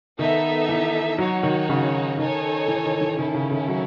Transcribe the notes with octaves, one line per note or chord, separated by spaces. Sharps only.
D#3 B3 D#4 A4 E5
E3
F#3 D#4 F#4 C#5
D#3
C#3
D#3 D#4 A4 C#5 G#5
E3
D#3
E3
D#3 C#4 E4 A4
C#3
D#3
F#3